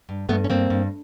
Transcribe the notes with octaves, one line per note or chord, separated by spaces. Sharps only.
G2
G2 A3 B3
C#4
G2 A#3 C4
G2